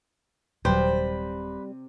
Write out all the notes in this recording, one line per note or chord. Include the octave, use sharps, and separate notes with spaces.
D#1 C3 F#3 G3 B4 C5